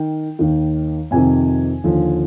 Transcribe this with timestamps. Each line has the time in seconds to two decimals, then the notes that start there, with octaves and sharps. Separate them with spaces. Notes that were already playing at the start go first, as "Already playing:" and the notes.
Already playing: D#3 G5
0.39 D#2 D#3
1.11 F2 C3 D#3 G#5
1.84 D#2 D3 F3